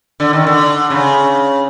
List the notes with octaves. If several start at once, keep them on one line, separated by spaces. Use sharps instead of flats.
D3
D#3
D3
C#3